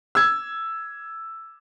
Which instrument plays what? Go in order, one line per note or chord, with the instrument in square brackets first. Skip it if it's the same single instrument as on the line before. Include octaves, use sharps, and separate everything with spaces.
[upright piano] E6 G#6